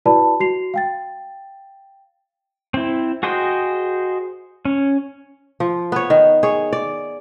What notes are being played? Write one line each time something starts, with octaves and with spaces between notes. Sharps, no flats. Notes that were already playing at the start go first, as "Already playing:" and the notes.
E4 F#4 B4 D5 A5 B5
F#4 C7 F7
F5 G5 A6
C4 E4
F#4 G#4 C5 D#5 G5
C#4
F3
B3 C#5
D#3
G#4 C#5
D5